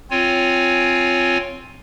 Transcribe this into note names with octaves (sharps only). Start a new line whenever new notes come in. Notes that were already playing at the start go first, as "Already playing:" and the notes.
C4 F4 C#5 G#5